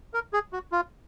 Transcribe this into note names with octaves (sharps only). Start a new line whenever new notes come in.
A#4
G#4
F#4
F4